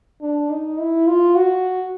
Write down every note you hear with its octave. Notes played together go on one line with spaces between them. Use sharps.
D4
D#4
E4
F4
F#4